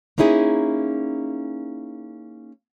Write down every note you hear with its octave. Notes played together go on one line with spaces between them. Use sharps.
A#3 C#4 D#4 E4 G#4